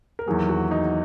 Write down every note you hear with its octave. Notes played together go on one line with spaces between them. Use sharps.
A#4
E2 D#3 F#3 A#3 G#4
F#4
D#4